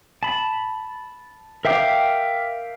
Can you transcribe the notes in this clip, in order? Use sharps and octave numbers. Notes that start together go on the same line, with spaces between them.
A5 B5
A#4 E5 F5 G5 D6